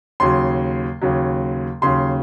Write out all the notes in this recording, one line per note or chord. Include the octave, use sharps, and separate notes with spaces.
D#2 C#3 F#3 C6
D#2 C#3 F#3
D#2 C#3 F#3 C6